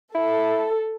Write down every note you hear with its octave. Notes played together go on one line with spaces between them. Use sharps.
E4 A4